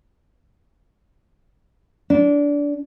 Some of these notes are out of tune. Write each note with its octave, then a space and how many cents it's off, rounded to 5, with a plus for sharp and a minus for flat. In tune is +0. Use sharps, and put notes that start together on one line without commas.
D4 -20